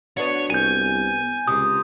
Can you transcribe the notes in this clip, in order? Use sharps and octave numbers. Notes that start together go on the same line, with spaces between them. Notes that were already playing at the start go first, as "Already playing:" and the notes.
B3 D4 F#4 C#5
C2 G#5 G6 D#7
C#2 C3 D#6